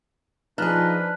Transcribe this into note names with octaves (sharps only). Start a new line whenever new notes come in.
F3 D4 D#4 G#4 B4 A5 F6 F#6